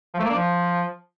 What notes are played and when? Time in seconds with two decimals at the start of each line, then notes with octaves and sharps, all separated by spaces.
0.14 F3
0.19 A3
0.25 A#3
0.30 D4
0.35 F3